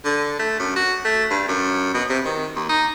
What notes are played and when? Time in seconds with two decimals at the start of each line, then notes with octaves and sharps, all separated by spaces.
0.05 D3
0.39 A3
0.59 F#2
0.76 F#4
1.04 A3
1.31 G2
1.48 F#2
1.94 B2
2.09 C3
2.25 D#3
2.55 D#2
2.69 D#4